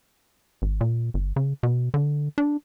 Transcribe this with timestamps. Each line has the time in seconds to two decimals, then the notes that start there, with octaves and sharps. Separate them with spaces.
0.62 G#1
0.81 A#2
1.14 G1
1.36 C#3
1.63 B2
1.94 D3
2.38 D4